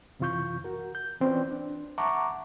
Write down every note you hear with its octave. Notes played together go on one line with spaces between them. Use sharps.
F#2 C3 E3 F4 C#6 G6
F#4 A#4
G6
E3 C4 C#4 F4 B4 D5
D4
E5 F#5 A5 A#5 C#6 D6